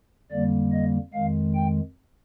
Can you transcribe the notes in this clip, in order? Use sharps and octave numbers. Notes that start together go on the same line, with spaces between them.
F2 D3 G3 A#3 D5
D#5
F2 D#3 G#3 F5
G5